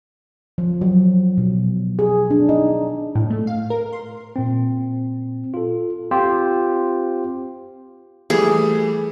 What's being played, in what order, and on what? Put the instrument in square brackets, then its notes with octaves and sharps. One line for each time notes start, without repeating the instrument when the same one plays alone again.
[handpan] F3
F#3
B2
G#4
D4
D#4
[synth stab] A2
A3
F5
A#4
C6
[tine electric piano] A#2 C4
F4 A4
C4 F4 G4 C5
[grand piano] E3 G3 A3 [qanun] G#4